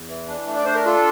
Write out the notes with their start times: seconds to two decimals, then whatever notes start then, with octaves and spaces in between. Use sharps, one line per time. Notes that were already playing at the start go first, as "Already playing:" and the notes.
Already playing: E2
0.08 E3
0.28 D4
0.47 A3
0.55 D5
0.65 D4 C5
0.75 A#4
0.86 F4 A4